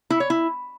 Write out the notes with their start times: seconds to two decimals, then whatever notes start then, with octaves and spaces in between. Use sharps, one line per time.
0.10 E4
0.20 C#5
0.30 E4